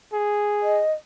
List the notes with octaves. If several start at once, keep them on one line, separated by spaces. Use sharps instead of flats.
G#4
D#5